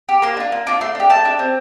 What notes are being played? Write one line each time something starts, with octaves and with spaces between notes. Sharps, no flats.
G4
A#3 C6
D4 F4
A#3
D4 F4 D6
A3 C6
D4 G4
A3 A5
D4 G4
C4